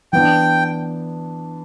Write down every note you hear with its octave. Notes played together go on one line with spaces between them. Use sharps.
E3 B3 D4 G5